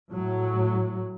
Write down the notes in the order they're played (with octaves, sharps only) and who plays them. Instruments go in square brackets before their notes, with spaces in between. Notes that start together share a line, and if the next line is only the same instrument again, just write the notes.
[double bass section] A2 F#3